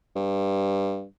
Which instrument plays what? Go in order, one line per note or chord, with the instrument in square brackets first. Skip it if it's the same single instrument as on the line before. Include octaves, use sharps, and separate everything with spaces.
[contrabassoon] G2